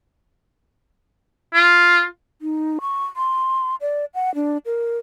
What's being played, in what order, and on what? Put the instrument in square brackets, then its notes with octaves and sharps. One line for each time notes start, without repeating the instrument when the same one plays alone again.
[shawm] F4
[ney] D#4
C#6
C6
D5
F#5
D4
A#4